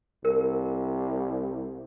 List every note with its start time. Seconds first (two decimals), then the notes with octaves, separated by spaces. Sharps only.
0.25 C2 A#4